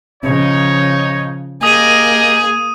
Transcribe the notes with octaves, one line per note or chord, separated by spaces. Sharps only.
C#3 F3 D#4 C#5
A#3 G4 G#4 A#4 D#5 D#6 D#7